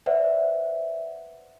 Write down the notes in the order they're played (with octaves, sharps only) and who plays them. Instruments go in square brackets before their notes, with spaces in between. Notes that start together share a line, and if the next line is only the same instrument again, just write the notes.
[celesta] B4 C5 D5 E5 F#5